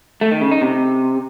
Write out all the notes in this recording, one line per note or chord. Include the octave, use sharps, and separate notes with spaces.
A3
D#3
C#3
D#4
C3